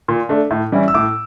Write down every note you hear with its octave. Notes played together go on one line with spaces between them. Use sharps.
A#2
A3 D4
A2
E3 G3 C#4 E4
E6
A2 D6